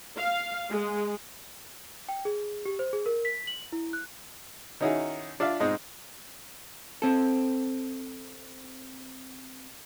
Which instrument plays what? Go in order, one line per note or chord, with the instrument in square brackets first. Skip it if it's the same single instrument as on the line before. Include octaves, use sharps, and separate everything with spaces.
[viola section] F5
G#3
[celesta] G5
G#4
G4
C5
G#4
A#4
B6
F#7
E4
F#6
[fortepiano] D#3 C#4 D#4 E4 F#4 G#4
D4 F4 D5 E5 F5
G#2 B2 G#3 C4 D#4
[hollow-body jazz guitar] C4 A4